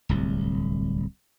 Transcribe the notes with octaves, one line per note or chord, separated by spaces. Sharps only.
D1 C2